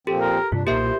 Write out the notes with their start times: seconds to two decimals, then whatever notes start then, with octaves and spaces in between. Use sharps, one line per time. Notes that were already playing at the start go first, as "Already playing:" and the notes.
0.07 A#2 F3 C4 G4 A4
0.21 A#4
0.52 G2 C3 D4 F4
0.67 B1 A#2 A#3 D#4 G4 A#4 C5 E5
0.83 E4